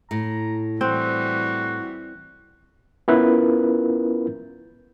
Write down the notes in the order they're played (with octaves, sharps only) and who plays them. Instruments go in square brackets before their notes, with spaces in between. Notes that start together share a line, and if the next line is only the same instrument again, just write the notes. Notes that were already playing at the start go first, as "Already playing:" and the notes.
[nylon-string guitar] A2 [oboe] A#5
[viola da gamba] E3 G3 [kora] C4 [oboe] F#4
[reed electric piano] B3 C#4 E4 F4 A#4 B4